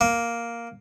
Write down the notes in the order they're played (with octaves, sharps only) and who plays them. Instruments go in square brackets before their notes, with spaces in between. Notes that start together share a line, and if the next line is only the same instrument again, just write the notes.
[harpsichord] A#3